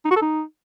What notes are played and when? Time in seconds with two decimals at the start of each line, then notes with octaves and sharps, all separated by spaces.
0.05 D#4
0.11 F#4
0.16 A4
0.22 D#4